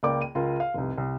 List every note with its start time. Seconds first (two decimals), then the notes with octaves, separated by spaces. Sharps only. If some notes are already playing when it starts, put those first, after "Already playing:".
0.03 C#2 A#3 D5 G5 D6
0.22 D#7
0.35 C#2 F4 A#4 C6
0.60 F5
0.74 F1 C2
0.98 C2